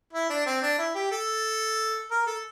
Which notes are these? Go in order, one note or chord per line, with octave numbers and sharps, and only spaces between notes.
E4
D4
C4
D4
E4
G4
A4
A#4
A4